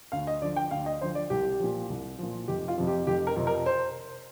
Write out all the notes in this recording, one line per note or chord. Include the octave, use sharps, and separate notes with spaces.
D2 F5
D#5
D3 F3 D5
G5
D2 F5
D#5
D3 F3 C5
D5
C2 G4
A#2 F3
C2
A#2 F3
F1 G4
F4
F2 C3 F3
G4
F1 G4
A#4
F2 C3 F3
A#4
C5